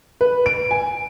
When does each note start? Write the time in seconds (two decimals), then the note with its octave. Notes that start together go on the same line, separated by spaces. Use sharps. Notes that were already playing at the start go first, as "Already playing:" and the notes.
0.21 B4
0.46 D7
0.71 G#5